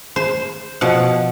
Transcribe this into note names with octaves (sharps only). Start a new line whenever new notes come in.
C5
B2 F3 F#5